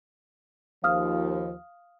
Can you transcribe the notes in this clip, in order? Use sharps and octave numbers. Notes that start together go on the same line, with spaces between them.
D#2 F3 F5 D#6 F6